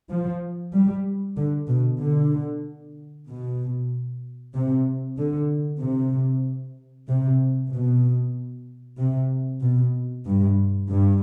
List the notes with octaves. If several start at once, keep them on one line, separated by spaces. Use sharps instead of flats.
F3
G3
D3
B2
D3
B2
C3
D3
C3
C3
B2
C3
B2
G2
G2